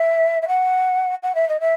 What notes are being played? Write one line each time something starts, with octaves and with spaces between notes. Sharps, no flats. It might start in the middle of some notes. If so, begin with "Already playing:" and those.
Already playing: E5
E5
F#5
F#5
E5
D#5
E5